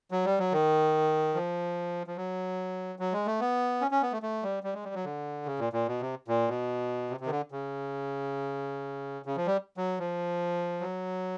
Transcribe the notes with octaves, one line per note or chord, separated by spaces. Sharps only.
F#3
G3
F#3
D#3
F3
F3
F#3
F#3
G#3
A3
B3
C#4
C#4
B3
A3
A3
G3
G3
G#3
G3
F#3
D3
C#3
A#2
A#2
B2
C3
A#2
B2
C3
C3
D#3
D3
C#3
C#3
F3
G3
F#3
F3
F#3